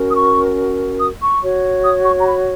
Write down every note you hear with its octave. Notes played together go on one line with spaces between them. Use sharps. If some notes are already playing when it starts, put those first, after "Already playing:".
Already playing: C#4 F#4 A#4
D#6
C#6
D#6
C#6
F#4 C#5
D#6
C#6
A#5
B5